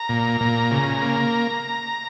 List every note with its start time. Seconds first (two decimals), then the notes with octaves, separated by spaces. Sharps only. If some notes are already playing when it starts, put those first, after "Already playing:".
Already playing: A#5
0.09 A#2
0.41 A#2
0.71 C#3
1.02 A#3